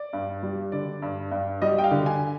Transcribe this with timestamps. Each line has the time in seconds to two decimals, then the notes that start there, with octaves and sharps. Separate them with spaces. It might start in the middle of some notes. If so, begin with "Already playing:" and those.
Already playing: D5
0.13 G2
0.43 G3
0.72 D3 D5
1.02 G2
1.31 G2
1.62 G3 D#5
1.78 G5
1.84 F5
1.91 D3
2.06 G#5